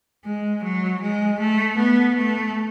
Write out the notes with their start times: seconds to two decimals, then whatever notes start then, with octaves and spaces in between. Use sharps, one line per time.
0.25 G#3
0.64 F#3
1.02 G#3
1.40 A3
1.78 B3
2.16 A3